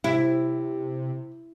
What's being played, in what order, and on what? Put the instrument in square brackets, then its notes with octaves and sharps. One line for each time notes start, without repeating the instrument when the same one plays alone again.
[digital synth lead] C3 [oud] E4